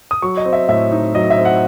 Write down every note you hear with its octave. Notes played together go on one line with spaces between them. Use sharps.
D#6
F#3 C#6
D#5
C4
E5
A2 E5
D#4
F#3 D#5
E5
C4
F#5